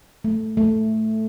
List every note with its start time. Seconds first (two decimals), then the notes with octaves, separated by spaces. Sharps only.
0.24 A3
0.57 A3